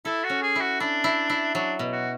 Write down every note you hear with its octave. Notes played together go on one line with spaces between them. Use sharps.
E4 A4
F#4
C#4
G#4
E4
F#4
D4 E4
E4
E4
F#3 D4
B2
F#4